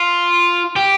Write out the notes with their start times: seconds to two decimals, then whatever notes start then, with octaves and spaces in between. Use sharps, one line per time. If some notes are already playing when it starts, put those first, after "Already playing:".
Already playing: F4
0.76 G4